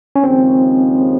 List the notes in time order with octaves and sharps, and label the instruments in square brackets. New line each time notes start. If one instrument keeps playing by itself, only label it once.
[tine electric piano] C#4
[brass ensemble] D#2 C#3 F3 G#3 [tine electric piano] C4